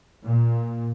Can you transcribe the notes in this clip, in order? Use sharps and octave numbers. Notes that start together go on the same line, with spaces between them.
A#2